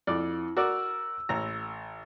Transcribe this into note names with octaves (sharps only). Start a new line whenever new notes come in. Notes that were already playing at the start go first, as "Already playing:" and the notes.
F2 E4 D5
F#4 A#4 D5 E6
A1 A#5